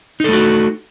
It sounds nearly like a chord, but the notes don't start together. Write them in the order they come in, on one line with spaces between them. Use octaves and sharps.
D#4 A4 A3 F#4